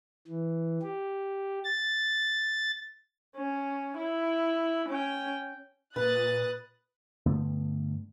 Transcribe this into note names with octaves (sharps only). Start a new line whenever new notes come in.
E3
G4
A6
C#4
E4
C#4 G5
A#2 B4 D#6 F#6 A6
G2 D3 A3 B3